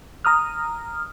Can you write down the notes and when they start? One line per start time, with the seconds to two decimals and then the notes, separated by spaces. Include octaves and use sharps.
0.25 A#5 D#6 F6